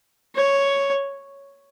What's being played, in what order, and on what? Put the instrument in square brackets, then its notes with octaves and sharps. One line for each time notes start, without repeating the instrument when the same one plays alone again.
[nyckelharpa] C#5